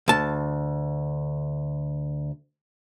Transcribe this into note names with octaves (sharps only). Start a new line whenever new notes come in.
D2 A5